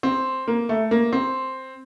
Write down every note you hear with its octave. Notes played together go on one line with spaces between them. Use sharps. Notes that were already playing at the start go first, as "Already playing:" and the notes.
C4
A#3
A3
A#3
C4